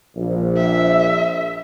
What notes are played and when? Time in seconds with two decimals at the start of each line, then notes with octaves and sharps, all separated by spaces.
0.16 A#1
0.57 E5